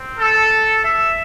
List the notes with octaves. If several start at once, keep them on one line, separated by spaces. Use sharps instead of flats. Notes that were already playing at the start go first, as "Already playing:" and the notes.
Already playing: C4
A4
E5